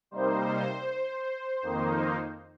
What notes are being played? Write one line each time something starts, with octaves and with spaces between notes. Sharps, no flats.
C3 G3 A#3 D#4 C5
F2 D#3 A#3 D#4